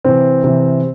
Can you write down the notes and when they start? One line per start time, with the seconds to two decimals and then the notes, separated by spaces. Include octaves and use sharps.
0.04 C3 E3 C4
0.44 C3 E3